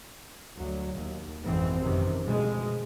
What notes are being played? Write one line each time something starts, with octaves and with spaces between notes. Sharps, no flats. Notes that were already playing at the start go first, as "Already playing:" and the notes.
D2 F#3
D#2
G#1 F2 G#2 B2 E3 C4
F#2 C3 D#3 E3
D2 B2 F3 G#3